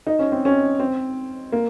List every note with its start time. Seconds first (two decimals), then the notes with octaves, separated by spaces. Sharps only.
0.07 D#4
0.19 C#4
0.32 C4
0.45 C#4
0.79 C4
1.52 A#3